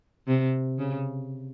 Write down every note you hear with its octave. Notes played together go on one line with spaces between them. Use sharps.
C3
C#3